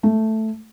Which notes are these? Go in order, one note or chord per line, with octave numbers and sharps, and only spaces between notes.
A3